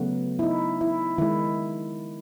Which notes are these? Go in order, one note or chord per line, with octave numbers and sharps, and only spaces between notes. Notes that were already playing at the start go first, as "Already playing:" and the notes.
Already playing: C#3 F#3 A3 B3
E4
D#4
E4
D#3 G#3 E4